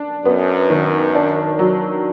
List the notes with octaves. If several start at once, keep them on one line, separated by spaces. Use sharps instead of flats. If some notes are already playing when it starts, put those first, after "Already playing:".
Already playing: D4
F#2 B3
D#3
D4
F#3